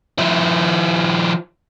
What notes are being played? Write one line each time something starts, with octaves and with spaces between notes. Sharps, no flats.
F3 E4